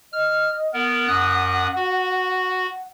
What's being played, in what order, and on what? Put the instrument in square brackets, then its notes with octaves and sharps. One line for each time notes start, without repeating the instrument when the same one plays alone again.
[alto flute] D#5 [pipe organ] F6
[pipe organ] B3 A#4 [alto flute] F#5
[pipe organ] F#2 D#6 F#6
F#4